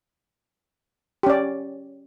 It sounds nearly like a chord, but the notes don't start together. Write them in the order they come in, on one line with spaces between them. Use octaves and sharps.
G4 C#4 D5